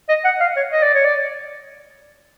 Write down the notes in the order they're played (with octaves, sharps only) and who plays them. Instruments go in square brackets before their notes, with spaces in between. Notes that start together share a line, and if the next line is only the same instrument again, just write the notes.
[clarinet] D#5
F#5
F5
C#5
D#5
D5
C#5
D5